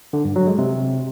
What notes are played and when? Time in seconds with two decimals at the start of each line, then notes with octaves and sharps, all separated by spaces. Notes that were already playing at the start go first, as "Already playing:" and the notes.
0.13 D3
0.25 G2
0.36 F#3
0.47 G#3
0.58 C3